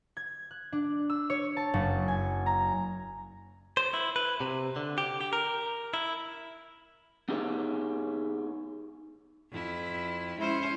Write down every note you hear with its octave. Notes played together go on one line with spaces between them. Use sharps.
G#6
F#6
D4
E6
C#5
A5
F#1
G#5
A#5
C5
E4
B4
C3
D3
G4
G4
A#4
E4
B3 D#4 G4 G#4 C#5 E5
F2 E4
G#3 C#4 E4 C5